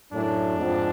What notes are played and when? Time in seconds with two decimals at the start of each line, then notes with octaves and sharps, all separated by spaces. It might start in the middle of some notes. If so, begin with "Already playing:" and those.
0.12 F#2 A2 D4
0.57 F2 G#2